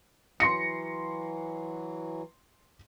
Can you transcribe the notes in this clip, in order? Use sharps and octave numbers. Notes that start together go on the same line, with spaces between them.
E3 F#3 C6 A#6 C#7